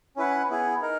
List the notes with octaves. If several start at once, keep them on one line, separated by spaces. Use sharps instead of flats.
C#4 E4 B4 F#5
B3 E4 G#4
D#4 A#4